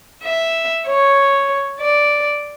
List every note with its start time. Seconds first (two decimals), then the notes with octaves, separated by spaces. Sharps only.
0.23 E5
0.86 C#5
1.80 D5